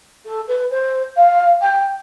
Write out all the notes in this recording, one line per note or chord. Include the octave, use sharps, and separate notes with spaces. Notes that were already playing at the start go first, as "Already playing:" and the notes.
A4
B4
C5
F5
G5